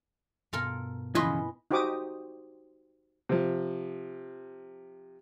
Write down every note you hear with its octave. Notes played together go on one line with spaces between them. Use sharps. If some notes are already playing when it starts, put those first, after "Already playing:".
G2 B2 B3 F4 A4 A#4
C#3 E3 F3 E4 B4 D#5 G#5 C6
D#4 F#4 G4 C5 D6 D#6
C3 F3